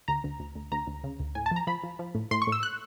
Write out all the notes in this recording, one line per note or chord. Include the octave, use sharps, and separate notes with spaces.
D2 A#5
D2
D2
D2
D2 A#5
D2
C#3
D2
A2 G#5
A5
F3 A#5
F3 B5
F3
F3
A2
A2 C6
C#6
A2
E6
F#6